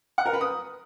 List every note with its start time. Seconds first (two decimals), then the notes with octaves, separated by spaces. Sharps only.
0.18 F#5
0.26 A#4
0.33 B4
0.41 D#6